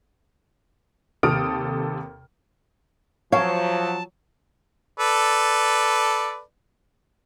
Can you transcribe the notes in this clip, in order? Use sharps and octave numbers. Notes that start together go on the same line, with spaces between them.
D#2 C3 A4 D#6 F6 D7
F3 F#3 C#5 F5 G5 A5
A4 B4 D5